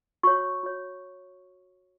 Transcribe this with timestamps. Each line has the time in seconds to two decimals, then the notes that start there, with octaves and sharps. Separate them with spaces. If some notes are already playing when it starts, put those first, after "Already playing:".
0.23 F#4 C#5 C#6
0.63 F#4 C#5